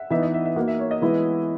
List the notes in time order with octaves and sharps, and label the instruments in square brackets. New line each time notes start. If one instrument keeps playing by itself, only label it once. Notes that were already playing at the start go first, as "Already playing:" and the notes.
Already playing: [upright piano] E5 F#5
[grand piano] E3 B3 D#4 [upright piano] E5
[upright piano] D#5
E5
E5
[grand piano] A#3 D#4 F#4 [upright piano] F#5
[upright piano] E5
C#5
D#5
[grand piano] E3 G#3 B3 E4